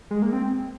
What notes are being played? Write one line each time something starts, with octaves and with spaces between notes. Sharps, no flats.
G#3
A#3
C4